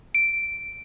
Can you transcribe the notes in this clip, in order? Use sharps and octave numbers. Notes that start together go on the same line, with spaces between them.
D7